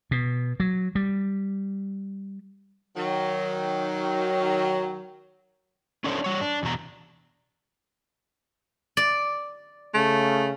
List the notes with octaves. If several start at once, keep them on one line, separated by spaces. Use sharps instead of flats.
B2
F#3
G3
D#3 F#3
C#4 D4 A4 A#4 C5 C#5
G3 C#5
D4
E2 B2 A#5
D5
C#3 A3